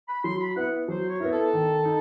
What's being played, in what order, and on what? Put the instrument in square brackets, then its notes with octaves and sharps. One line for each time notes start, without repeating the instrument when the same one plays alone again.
[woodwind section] B5
[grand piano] F#3 [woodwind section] C6
[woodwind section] B5
[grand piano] B3 E4 [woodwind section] F#5
[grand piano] F#3 [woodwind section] C5
[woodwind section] C#5
[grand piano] B3 E4 [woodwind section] A#4
[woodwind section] A4
[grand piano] D#3
D#4